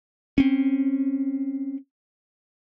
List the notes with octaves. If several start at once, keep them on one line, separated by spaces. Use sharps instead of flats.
C4 C#4